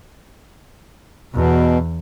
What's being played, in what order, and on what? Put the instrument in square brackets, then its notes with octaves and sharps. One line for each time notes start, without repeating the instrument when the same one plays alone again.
[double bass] E2 [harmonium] B2